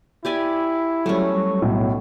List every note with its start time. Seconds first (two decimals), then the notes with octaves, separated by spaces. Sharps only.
0.25 E4 G4 D5 G#5
1.06 F#3 G3 A3 C#4
1.62 B1 A2